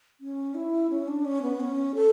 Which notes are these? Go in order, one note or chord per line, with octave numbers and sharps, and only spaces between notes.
C#4
E4
C#4
D4
C#4
B3
C#4
A4